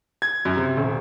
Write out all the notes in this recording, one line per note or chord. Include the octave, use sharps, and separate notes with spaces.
G#6
F#2
C3
D#1